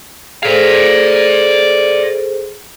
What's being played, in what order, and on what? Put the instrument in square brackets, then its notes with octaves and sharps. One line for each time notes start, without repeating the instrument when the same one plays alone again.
[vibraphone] G#4 A4 C5 [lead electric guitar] D5 F5